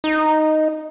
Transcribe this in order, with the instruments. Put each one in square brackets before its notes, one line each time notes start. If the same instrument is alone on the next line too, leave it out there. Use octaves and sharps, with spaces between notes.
[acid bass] D#4